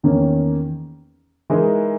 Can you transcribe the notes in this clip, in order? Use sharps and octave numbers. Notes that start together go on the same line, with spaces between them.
E2 D#3 A#3 C#4
E3 G#3 D#4 A#4